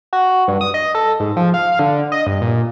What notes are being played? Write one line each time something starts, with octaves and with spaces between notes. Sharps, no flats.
F#4
G2
D#6
D#5
A4
G#2
F3
F5
D3
D#5
G2
A#2